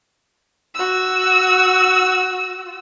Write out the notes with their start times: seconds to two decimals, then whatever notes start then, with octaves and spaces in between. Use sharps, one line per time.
0.75 F#4 E6